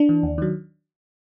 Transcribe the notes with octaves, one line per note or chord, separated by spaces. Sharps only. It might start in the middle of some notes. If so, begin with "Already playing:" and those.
Already playing: D4
E3
D#2
D#3 F#3